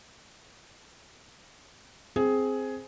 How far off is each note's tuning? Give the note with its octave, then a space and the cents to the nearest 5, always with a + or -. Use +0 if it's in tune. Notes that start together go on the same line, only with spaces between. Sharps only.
C4 +0 G#4 +10